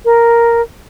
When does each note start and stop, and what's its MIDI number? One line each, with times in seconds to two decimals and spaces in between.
0.05 0.62 70